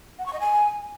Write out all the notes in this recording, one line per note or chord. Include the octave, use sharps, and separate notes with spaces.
F#5
C#6
D#5
G#5